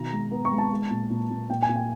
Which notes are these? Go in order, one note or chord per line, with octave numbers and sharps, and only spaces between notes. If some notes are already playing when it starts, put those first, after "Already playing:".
Already playing: B2 D#3 A#5
G#3
B3
C#6
G#3
A5
G#3
A#2
A#2
A#2
A#2 G5
G#5
A#2
G5